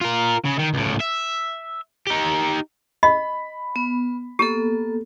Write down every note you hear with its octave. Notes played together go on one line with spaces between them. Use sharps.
F4 A#4
C#3
D#3
C#2 A2
E5
D#4 G4
D#5 B5
B3
A#3 B3 G4 A4